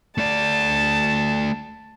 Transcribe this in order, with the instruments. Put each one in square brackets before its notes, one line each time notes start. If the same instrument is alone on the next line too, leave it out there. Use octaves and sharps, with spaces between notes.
[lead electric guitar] A3 D5 [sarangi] A5